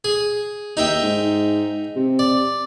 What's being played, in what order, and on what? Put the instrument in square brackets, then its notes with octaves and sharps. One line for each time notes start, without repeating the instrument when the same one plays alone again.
[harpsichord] G#4
[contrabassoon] D#2 [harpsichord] D#4 E5 G5
[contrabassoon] G#2
C3
[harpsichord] D5